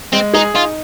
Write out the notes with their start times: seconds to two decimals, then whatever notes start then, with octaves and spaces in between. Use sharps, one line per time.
0.13 G#3 C4
0.34 D#4 G#4
0.54 D#4 F4